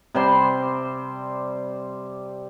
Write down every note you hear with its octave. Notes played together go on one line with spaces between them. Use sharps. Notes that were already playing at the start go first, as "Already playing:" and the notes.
C3 G3 C5 C6